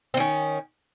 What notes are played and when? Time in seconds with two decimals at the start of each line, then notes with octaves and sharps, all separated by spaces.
0.14 C4
0.17 D#3
0.20 C#4